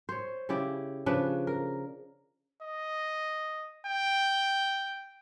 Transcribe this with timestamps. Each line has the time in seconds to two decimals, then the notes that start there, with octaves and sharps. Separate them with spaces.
0.09 C5 C#5
0.49 C#3 E4 G4 D5
1.06 C#3 F3 D4 B4
1.47 A#4
2.62 D#5
3.87 G5